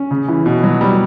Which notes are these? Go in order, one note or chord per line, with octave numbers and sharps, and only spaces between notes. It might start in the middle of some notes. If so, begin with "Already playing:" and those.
Already playing: C#4
C#3
E3
B2
F#3
G3